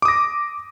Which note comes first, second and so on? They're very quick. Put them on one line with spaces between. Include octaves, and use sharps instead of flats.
D6 D#6 A#6